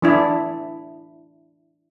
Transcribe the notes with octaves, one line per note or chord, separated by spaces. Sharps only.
E3 D4 E4